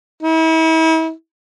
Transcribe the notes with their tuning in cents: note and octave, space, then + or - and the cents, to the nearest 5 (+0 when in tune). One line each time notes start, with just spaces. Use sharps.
E4 -40